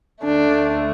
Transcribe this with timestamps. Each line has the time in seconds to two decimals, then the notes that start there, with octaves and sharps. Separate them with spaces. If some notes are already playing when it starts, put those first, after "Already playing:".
0.23 D2 D3 A3 D4